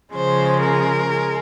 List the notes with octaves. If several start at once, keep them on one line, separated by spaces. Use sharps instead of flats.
C#3 F3 G#3 C5
A#4
G#3